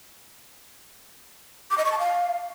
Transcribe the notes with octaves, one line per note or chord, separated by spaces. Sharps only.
D6
D#5
C#6
A5
F5